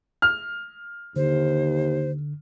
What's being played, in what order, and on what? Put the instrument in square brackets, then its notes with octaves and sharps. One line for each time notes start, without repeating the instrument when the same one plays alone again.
[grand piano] F6
[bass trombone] D#2 [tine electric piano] D3 [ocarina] C5